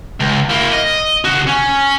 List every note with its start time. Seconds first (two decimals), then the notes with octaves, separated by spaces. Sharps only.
0.20 C#2
0.50 A#3 E4
0.72 D#5
1.24 C#3 F#4
1.47 C#4